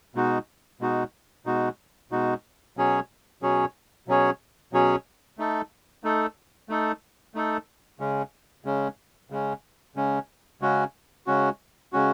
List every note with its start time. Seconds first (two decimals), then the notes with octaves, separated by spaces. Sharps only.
0.15 B2 G#3 D#4 F#4
0.81 B2 G#3 D#4 F#4
1.46 B2 G#3 D#4 F#4
2.11 B2 G#3 D#4 F#4
2.77 B2 F#3 C#4 G#4 C#5
3.42 B2 F#3 C#4 G#4 C#5
4.08 B2 F#3 C#4 G#4 C#5
4.73 B2 F#3 C#4 G#4 C#5
5.38 A3 D#4 A4
6.04 A3 D#4 A4
6.69 A3 D#4 A4
7.34 A3 D#4 A4
8.00 C#3 G#3 C#4
8.65 C#3 G#3 C#4
9.30 C#3 G#3 C#4
9.95 C#3 G#3 C#4
10.61 C#3 G#3 C#4 F#4
11.27 C#3 G#3 C#4 F#4
11.93 C#3 G#3 C#4 F#4